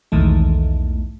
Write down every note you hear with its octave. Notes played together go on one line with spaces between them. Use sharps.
B1 E2 G#2 D#3 E3 A3